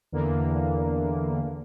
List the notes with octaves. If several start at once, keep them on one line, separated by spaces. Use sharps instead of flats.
E2 D3 E3 A#3